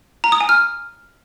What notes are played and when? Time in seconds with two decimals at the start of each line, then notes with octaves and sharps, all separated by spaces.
0.24 A#5
0.32 D#6
0.41 G#5
0.49 F6